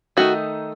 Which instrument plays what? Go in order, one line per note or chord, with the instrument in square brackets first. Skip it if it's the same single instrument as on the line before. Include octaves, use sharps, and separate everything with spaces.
[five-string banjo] D#3 A3 D#4 F#4